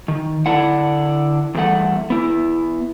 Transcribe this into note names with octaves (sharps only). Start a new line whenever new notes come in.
D#3
D3 D4 E4 F#5
E2 G2 A3 F#5
B3 E4